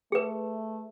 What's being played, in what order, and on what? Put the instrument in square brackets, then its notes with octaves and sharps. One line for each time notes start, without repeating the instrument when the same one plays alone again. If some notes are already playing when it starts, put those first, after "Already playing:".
[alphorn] A3 [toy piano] G#4 B4